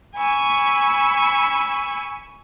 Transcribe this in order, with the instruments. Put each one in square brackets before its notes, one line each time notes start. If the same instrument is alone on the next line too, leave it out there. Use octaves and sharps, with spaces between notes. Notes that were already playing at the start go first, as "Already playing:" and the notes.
[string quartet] G#5 B5 C#6 E6